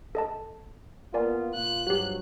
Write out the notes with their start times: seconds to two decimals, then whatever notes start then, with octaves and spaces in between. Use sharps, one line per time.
0.15 A4 D#5 A5
1.14 A#3 B3 F4 A#4 D5 G#5
1.55 A#2 F4 F#6
1.87 G2 F3 F#3 F#4 G4